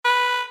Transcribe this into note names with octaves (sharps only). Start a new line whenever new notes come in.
B4